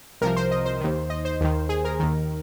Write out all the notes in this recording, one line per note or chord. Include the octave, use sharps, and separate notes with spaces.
C2 C3 F3 A#4
C5
D#5
C5
D#2 D#3
D#5
C5
D#2 D#3
G#4
A#4
D#2 D#3